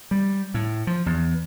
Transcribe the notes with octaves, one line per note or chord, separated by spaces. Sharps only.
G3
A2
F3
E2